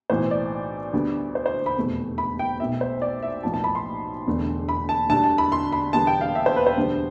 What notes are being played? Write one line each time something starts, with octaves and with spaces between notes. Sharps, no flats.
B1 A2 E3 C5
D5
D2 D3 G3 B3
C5
C5
B5
F1 E2 B2 A3
B5
G5
B1 B2 A3 E5
C5
D5
E5
B1 A2 F3 B3 A5
A5
B5
C6
E1 E2 D3 A3
B5
A5
D2 D3 G3 A5
A5
B5
C6
B5
E1 E2 D3 G3 B3 A5
G5
F5
E5
C5
B4
C5
E1 D2 D3 G3 B3